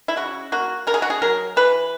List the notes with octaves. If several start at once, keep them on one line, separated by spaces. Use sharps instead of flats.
E4
C#3 F#4
A#3 F#4
C#3 A#4
G#4
F#4
G#4
F#3 A#4
E3 B4